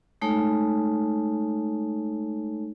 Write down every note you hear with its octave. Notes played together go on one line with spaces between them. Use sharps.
G#3 A3 D#4 A4 C#5